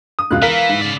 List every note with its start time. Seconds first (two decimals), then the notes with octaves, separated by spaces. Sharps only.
0.19 D#6
0.31 E1 C#2 F4 F#6
0.42 E3 A#4 F5 B6
0.69 G#2
0.81 C#3 D5